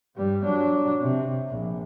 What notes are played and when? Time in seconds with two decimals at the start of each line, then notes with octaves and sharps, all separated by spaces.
0.15 G2 G3
0.44 F#3 D4
1.01 C3
1.49 A#1